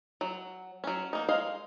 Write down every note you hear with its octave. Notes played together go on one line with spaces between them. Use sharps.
F#3
F#3 C#4
A#3 D#4
G#3 D#5 F5